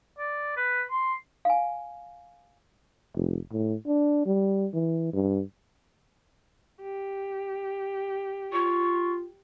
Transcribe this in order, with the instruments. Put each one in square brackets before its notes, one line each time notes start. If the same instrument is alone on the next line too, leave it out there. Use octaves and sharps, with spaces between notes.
[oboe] D5
B4
C6
[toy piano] F5 G#5
[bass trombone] F1
A2
D4
G3
E3
G2
[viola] G4
[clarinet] F4 [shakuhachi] C#6